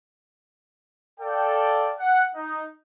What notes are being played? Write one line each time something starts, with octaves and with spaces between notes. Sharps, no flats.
A4 D5 F5 G5
F#5
D#4